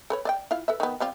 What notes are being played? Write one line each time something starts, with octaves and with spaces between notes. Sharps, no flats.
A4 B4 C#5
D5 D#5 G5
E4 F4 F5
A4 B4 E5
D#3 B3
G3 C4 F4